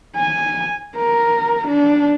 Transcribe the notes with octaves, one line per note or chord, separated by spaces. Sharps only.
G#5
A#4
D4